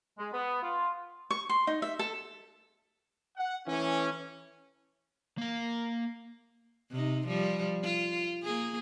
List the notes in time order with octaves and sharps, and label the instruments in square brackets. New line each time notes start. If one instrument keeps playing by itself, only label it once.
[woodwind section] G#3
B3
F4
[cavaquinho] C#6
C6
D#4
E5
A4
[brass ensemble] F#5
E3 A3 C#4
[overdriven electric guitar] A#3 F5
[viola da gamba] C3 D#4
F3 G3
F4
A#3 G#4